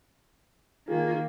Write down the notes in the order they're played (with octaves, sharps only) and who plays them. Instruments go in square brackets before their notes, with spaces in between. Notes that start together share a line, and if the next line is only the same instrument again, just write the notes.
[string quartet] D#3 A#3 [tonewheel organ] F4 G#4